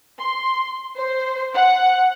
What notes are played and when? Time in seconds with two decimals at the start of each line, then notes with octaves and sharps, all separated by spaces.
0.17 C6
0.95 C5
1.53 F#5